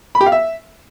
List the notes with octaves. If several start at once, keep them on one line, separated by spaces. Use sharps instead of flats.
B5
G4
F5
E5